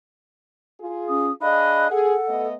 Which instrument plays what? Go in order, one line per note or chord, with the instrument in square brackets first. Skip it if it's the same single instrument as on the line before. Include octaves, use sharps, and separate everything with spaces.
[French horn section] F4 G#4
[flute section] C#4 D#6
[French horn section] D4 G#4 D#5 [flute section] F5 B5 F#6
[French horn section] G#4 [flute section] A4 F#5
[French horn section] A3 B3 D#5